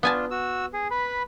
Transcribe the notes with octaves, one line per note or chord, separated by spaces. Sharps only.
B3 D4 F4 G#5 A5
F#4 E6
G#4
B4 B5